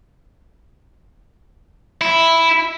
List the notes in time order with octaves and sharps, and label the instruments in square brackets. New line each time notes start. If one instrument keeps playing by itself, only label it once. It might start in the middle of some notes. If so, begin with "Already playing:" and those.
[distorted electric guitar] E4